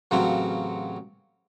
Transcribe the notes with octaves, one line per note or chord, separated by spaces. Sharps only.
A1 C#3 F#3 C4 F#4 F5